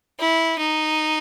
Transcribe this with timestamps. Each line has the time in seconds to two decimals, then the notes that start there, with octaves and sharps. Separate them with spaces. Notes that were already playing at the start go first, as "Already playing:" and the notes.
0.19 E4
0.59 D#4